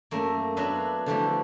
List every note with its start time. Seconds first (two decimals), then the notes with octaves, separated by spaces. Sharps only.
0.11 F#2 A3 A#3
0.56 F#3 B3 D4 B4 E5 F5
1.06 D3 E3 F3 G3 A3 B3